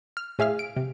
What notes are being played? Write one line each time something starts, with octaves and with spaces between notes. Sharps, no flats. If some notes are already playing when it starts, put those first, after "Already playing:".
F6
A2 G#4 E5 F5 F6
D7
C3